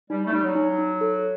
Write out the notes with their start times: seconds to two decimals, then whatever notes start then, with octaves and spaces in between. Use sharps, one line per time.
0.10 G3 D#4
0.27 A3
0.33 G3 D#4
0.44 F#3
0.55 D#4
0.78 D#4
1.01 A4